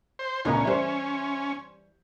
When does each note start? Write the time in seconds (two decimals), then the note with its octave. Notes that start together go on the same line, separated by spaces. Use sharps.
0.19 C5
0.45 C#2 A#2 A3 B3 C#4 D4 A#5
0.65 E3 G3 C5 E5